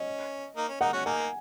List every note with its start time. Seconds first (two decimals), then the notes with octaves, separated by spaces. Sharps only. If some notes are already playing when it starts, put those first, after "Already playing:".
Already playing: C#4 D#5
0.56 A#3 D#4
0.69 C#4
0.81 A#3 D#4 F#5
0.93 C#4 F#4
1.05 A#3 D#4 G#5